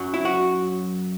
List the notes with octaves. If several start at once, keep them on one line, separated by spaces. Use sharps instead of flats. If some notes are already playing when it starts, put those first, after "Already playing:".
Already playing: F#2 F#3
E4
F#4